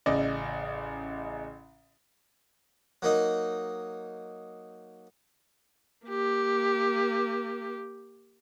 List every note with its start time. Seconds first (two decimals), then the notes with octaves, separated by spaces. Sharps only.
0.06 A1 C#3 D5 D#5
3.02 F#3 A#3 D#4
6.06 A#3 G4